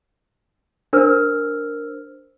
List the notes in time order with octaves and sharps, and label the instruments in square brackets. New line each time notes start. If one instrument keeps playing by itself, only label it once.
[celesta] D4 A#4 C5 E6 F6